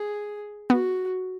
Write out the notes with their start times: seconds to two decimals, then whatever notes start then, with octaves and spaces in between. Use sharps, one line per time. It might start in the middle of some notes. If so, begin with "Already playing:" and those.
Already playing: G#4
0.70 B3 F#4